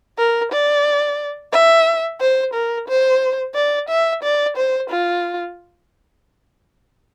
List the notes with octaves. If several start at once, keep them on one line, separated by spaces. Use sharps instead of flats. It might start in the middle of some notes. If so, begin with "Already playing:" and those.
A#4
D5
E5
C5
A#4
C5
D5
E5
D5
C5
F4